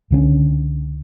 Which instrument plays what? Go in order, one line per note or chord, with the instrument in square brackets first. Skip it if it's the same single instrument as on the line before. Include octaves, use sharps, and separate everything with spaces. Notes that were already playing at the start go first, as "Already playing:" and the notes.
[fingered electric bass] C#2 D3 C#4